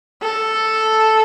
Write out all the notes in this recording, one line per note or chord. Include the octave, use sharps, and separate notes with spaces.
A4